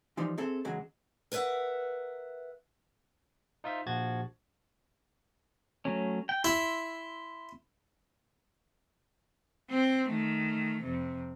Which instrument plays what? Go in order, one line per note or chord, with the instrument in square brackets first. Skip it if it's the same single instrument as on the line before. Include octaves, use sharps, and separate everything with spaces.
[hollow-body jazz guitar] E3 F3 G3 D#4 F4
C4 G#4 A4 E5
E2 C#3 F#3 G#3
[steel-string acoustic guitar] A#4 B4 C#5 E5 F#5
[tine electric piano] D#4 F4 C5 E5
A#1 F3 F#4 G#6 A6
[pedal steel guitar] F#3 A3 C#4
G5
[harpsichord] E4 [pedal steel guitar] C6 E6
[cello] C4
D#3 A3
F2 C3